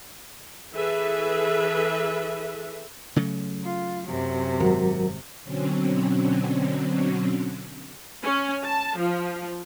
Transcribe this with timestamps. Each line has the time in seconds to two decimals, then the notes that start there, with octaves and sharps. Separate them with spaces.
0.72 E3 G#4 A4 B4 E5
3.16 C#3 F#3 A3
3.64 F4
4.06 F#2 C3
4.60 G#1 F#3 F#4 A#4
5.44 B2 D3 F#3 C4 C#4
8.23 C#4
8.64 A5
8.98 F3